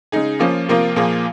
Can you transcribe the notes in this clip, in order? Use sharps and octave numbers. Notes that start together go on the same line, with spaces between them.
C#3 G#3 D#4 G#4
F3 A#3 C#4 F4
C3 F3 A#3 F4 A#4
A#2 F3 A#3 F4 G#4